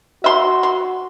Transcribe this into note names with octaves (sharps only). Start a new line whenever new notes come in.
F#4 E5 C6
C6